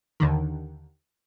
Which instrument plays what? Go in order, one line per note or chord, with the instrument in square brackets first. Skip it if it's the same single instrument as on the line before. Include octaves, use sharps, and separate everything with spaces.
[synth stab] D#2 D3 D#3